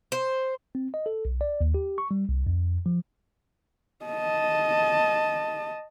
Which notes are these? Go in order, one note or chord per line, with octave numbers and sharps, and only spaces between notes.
C5
C4
D#5
A4
B1
D5
D#2
G4
C#6
G3
C2
F2
F3
D#5 A5